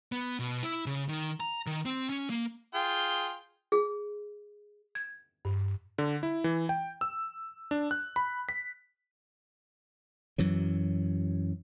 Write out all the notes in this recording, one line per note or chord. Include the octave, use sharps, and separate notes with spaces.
B3
B2
E4
C#3
D#3
A#5
D#3
C4
C#4
A#3
F4 G#4 G5
G#4
G#6
G2
D3
E4
E3
G5
E6
D4
F#6
B5
B6
F#2 E3 F#3